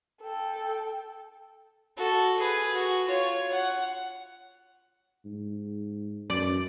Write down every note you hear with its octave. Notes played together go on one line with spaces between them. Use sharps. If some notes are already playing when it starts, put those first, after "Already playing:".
A4 G5
F#4 A4
G#4 B4
F#4
F4 C#5
F#5
G#2
F#2 D5